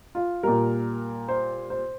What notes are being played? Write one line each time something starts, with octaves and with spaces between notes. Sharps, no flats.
F4
A#2 G3 A#4
C5
C5